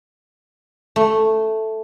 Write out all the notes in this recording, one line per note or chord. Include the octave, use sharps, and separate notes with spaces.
A3